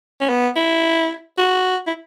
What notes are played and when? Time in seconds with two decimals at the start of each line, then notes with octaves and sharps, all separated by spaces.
0.21 C#4
0.29 B3
0.56 E4
1.38 F#4
1.87 E4